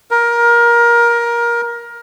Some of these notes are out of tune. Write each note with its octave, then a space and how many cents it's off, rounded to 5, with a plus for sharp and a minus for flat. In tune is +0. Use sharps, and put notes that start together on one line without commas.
A#4 +20